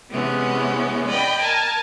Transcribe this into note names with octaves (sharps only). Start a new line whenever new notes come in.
C3 E3 G#3 B3 C#4
D5 D#5 G5 B5
A#4 G#5 A5